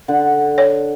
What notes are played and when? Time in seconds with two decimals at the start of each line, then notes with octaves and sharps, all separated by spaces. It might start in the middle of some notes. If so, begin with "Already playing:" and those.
0.08 D3 F#5
0.58 C#5